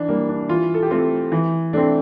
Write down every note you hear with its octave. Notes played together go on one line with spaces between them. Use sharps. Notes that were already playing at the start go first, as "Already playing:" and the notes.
Already playing: E3 D4
G3 A#3
D4
E3 F4
A4
G4
A3 C4 F4
E3
A3 C4 D4